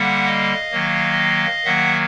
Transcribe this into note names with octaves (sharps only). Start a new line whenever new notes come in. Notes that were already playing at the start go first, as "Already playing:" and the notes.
Already playing: D3 G3 A#3 E5 F#5
D#5 F5
D#3 F#3 A#3
D#3 F#3 A#3 E5 F#5